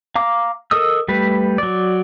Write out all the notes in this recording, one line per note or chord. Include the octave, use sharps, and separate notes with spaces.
F5 A#5 D6
A4 A#4 D#5 D#6 E6
G3 A3 B4
F#3 D5